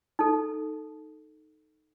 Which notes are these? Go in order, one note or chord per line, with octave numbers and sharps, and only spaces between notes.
D#4 A4